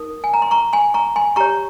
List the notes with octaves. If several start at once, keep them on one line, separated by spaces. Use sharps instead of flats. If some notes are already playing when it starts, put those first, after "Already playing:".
Already playing: D#4 A#4 D#6
G#5
A#5
C6
A#5 C#6
G#5 C6
A#5 C#6
G#5 C6
G4 C#5 A#5 C#6